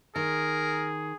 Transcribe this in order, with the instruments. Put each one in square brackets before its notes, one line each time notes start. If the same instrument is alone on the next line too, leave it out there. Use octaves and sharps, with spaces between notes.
[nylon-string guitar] D#3 [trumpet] G#4 [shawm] A#4